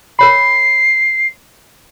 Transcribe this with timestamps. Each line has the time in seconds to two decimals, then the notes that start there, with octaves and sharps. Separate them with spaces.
0.19 A#4 C#5 B5 C7